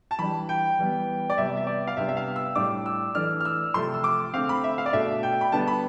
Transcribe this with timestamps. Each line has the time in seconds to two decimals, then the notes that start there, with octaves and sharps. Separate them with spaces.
0.11 A5
0.19 E3 G3 D4 B5
0.49 G5
0.79 E3 G3 B3
1.30 D5
1.38 C3 G3 B3 E5
1.57 E5
1.67 D5
1.87 F5
1.97 C3 G3 B3 D4 E5
2.08 E5
2.17 F5
2.36 E6
2.55 A2 G3 D4 D6
2.86 E6
3.15 E3 A3 D4 F6
3.40 F6
3.45 E6
3.74 C3 F3 A3 C6
3.94 E6
4.04 D6
4.34 D3 A3 C4 F5
4.49 B5
4.64 E5
4.78 F5
4.86 D5
4.93 B2 A3 D4 E5
5.23 G5
5.41 B5
5.52 D3 G3 B3 D4 A5
5.68 B5